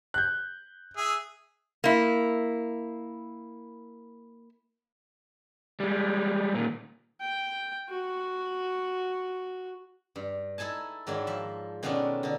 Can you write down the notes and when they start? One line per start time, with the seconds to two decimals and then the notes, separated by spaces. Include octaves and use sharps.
0.14 F#6 G6
0.97 G#4 E5
1.84 A#3 E4
5.80 G3 G#3
6.55 A#2 D#3
7.21 G5
7.89 F#4
10.16 G2
10.58 D#4 E4 A4 G#5 A5
11.07 G#2 D#3 F#3 D4 E4
11.27 F3 E5
11.83 B2 D#3 A3 B3 C#4 D4
12.23 D3 D#4